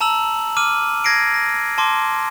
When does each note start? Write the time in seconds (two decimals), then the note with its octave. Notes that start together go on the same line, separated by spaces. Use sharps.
0.01 A5 A#5 E6 F#7
0.57 D6 F6 D#7
1.04 G#6 A#6 C7 D7
1.34 A#6
1.78 A5 C6 D6